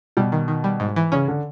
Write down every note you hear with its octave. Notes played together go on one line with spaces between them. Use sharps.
B2 G3
D#3
D#3
G3
G#2
E3
C#3 C#4
D3